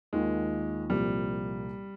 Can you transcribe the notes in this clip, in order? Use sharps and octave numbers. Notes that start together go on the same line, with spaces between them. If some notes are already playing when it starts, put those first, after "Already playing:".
D#2 D#3 G#3 A#3 F4
C2 A#2 F3 G3 A#3